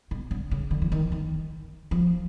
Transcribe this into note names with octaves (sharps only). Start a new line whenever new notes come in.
B2
D3
C#3
D3
E3
D#3
D#3
F3